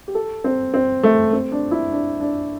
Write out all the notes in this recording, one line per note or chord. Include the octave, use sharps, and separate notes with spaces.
G4
A4
C4
C4
A3
C4
D4
E4
D4
D4